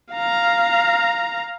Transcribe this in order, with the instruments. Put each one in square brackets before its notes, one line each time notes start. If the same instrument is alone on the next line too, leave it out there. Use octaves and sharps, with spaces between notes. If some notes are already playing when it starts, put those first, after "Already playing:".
[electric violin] F5 A#5